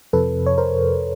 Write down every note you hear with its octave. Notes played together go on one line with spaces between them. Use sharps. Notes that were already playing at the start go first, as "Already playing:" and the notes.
F2 C3 F3 A4 B4
C#5
A#4 C5